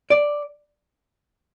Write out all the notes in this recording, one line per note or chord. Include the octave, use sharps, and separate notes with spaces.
D5